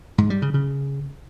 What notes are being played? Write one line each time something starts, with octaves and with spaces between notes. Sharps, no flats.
G#2
G3
C#3
C#3